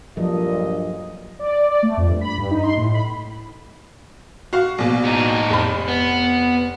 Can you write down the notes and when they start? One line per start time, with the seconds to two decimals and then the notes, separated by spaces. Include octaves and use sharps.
0.17 G2 A#2 F3 F#3 A4 D#5
1.39 D5
1.55 D5
1.71 D5
1.83 A3
1.97 F2
2.08 G2
2.21 B5
2.38 G2
2.50 D#4
2.63 C6
2.77 A2
2.94 B5
4.53 F#4 F5 C#6
4.78 A#1 B2
5.05 A2 D#4
5.50 F1 B5
5.88 B3